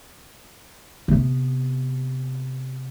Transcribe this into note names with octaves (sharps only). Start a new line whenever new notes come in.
C3 B3